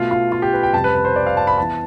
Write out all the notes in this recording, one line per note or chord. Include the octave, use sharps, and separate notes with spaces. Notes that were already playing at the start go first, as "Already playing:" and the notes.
Already playing: B2 A3 F4
F4
F4
G4
B4
G5
F2 C3 G3 A5
B4
B4
C5
D5
F5
A5
B5
E3 B3 A5